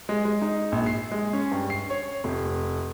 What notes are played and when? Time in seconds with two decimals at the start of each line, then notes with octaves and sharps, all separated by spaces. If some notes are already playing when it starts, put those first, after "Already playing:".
0.09 G#3
0.25 G#3
0.42 D#4
0.72 A#1
0.86 C7
1.11 G#3
1.33 C#4
1.51 G2
1.70 C7
1.90 C#5
2.24 F1